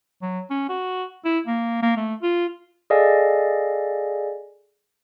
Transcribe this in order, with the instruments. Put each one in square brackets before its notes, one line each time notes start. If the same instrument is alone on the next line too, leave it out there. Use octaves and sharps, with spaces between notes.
[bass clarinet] F#3
C#4
F#4
E4
A#3
A#3
A3
F4
[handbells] G#4 A4 D5 D#5 F5 G#5